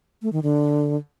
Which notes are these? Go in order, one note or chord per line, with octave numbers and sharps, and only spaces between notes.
A3
D#3
D3